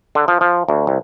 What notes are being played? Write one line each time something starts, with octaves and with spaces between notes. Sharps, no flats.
D3
F3
F3
D2
C2